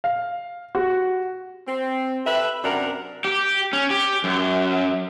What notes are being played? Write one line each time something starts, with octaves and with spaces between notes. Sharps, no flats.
F5
F#4
C4
G4 A4 B4 E5
F#2 C3 D4 A#4 F#5
G4
C#4
G4
F#2